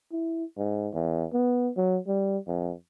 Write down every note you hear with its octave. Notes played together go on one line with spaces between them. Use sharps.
E4
G#2
E2
B3
F#3
G3
F2